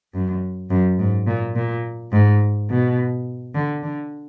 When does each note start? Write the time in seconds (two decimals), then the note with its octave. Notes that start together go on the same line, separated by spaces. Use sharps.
0.14 F#2
0.70 F#2
0.99 G#2
1.27 A#2
1.55 A#2
2.12 G#2
2.70 B2
3.55 D3
3.83 D3